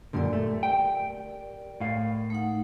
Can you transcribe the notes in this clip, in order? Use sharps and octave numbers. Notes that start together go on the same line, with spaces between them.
F#2 A#2 D3 G4 A#4 D5
A3
G5
A2 F5
A3 D#4 F#5